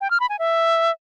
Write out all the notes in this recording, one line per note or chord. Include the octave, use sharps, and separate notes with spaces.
G5
F6
B5
G#5
E5